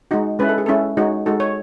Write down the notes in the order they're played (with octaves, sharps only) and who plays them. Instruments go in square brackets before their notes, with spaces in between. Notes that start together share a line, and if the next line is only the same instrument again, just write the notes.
[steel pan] G#3 D#4 F#4
G#3 C#4 E4 B4
A4
G#4
G#3 C#4 E4 A4
G#3 D#4 F#4 C#5
G#3 D#4 F#4 A4
C#5